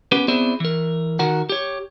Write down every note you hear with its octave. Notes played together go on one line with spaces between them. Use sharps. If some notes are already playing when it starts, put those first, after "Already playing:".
B3 C#4 G4 B4
B3 C4 E4 G#4 C5 D5
E3 A#4
D#3 F#4 A#4 F#5
G4 C#5